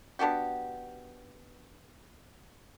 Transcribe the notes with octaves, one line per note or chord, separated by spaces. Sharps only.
B3 D4 F#4 G4